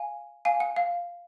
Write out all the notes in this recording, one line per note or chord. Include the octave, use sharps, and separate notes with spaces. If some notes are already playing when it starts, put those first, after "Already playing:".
Already playing: F5 G#5
F5 G#5
F#5
F5